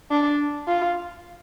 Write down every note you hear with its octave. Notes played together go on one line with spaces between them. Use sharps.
D4
F4